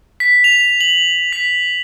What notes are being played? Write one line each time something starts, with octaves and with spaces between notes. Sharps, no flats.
B6
F7
F#7
B6